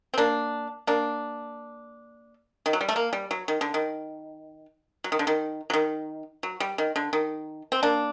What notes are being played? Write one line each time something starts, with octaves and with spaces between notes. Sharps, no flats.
C4
A#3 D4
A#3 D4
D#3
F#3
G3
A3
A#3
G3
F#3
D#3
D3
D#3
F#3
D#3
D3
D#3
F#3
D#3
F#3
G3
D#3
D3
D#3
C4
A#3 D4